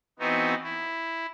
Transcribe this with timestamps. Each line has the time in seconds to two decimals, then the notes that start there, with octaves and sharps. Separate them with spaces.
0.19 E3 B3 C4 D#4 F#4
0.63 E4